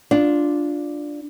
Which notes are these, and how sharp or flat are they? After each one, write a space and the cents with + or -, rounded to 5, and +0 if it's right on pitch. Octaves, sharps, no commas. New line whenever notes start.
D4 +0 F4 +0